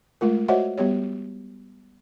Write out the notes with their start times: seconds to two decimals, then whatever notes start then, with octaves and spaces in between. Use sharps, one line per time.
0.21 G#3 A3 F4 A#4
0.48 F#4 C5 C#5 D#5 E5 F#5
0.78 G3 B3 G4 C#5